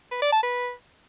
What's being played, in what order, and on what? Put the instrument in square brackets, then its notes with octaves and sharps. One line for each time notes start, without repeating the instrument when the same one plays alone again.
[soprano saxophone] B4
D5
A5
B4